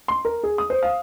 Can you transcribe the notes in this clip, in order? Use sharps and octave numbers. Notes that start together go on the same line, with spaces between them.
C6
A#4
G#4
D#6
C5
F5